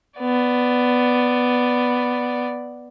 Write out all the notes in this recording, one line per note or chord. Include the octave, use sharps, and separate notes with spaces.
B3 D5